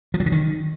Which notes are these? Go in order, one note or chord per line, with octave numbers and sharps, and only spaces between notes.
F3
F#3
D3
D#3